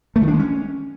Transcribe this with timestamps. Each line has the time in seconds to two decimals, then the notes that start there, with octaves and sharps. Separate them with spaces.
0.16 A3
0.22 D#3
0.27 D4
0.33 G#3
0.39 C#4